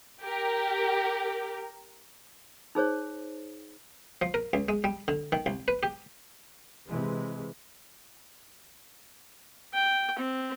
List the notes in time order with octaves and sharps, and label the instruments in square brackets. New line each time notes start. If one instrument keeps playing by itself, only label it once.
[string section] G4 A#4
[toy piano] D#4 G#4 C5 C#5
[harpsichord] F3
A#4
C#2
G#3
G3
D3
D#3
C2
B4
G4
[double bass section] C3 E3 G#3
[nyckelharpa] G5
C4